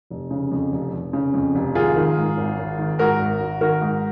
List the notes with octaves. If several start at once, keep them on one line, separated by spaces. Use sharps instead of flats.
F1
C#3
F2
F1
F1
C#3
F2
F1
G#1 F4 G#4
D#3
G#2
G#1
G#1
D#3
G#2 F#4 A#4
G#1
G#1
D#3 F#4 A#4
G#2